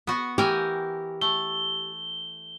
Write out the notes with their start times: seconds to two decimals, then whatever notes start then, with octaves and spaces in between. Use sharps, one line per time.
0.07 B3 F#4
0.38 E3 G4 A#4 G#5
1.21 A3 G7